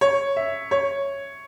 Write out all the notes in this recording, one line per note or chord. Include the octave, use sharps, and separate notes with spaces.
C#5
E5
C#5